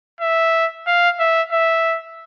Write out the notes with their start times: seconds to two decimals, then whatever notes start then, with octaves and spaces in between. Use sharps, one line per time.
0.21 E5
0.87 F5
1.19 E5
1.52 E5